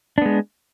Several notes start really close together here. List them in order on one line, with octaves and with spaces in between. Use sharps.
D4 B3 G#3